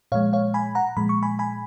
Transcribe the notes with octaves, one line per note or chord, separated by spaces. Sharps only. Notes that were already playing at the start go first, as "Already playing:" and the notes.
A#2 F3 G#3 C#5 F5
C#5 F5
G#5 B5
F#5 A#5
A#2 F3 G#3 B5
C#6
G#5 B5
G#5 B5